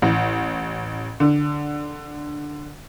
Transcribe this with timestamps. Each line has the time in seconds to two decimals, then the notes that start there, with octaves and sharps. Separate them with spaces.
0.02 A1
1.20 D3